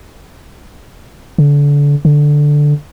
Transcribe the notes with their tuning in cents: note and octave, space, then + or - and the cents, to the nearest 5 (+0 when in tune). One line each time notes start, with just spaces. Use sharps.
D3 -30
D3 +0